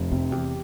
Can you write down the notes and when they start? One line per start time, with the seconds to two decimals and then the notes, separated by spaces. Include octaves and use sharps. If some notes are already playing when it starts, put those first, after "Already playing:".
Already playing: F1
0.11 F2 C3
0.32 E2 G4